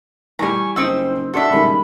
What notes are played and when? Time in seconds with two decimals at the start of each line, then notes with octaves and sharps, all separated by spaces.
0.39 E3 G3 G#5 A#5 C#6
0.76 F#1 C4 D#4 C5 E6
1.34 D4 F#4 A4 E5 C6
1.51 F#1 D#3 G3 G#3 B5